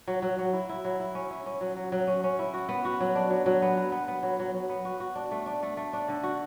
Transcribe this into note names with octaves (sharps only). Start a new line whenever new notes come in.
F#3
F#3
F#3
E4
E4
F#3
E4
C#4
E4
C#4
F#3
F#3
F#3
C#4
C#4
E4
F#4
B3
F#4
F#3
D4
F#3
F#3
B3
F#3
B3
B3
F#3
F#3
F#3
B3
F#4
F#4
D4
A3
D4
A3
A3
D4
D3
F#4